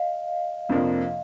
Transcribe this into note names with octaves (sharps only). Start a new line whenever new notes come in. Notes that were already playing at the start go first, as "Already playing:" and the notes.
Already playing: D#5 F5
F2 C3 F3 A#3 D4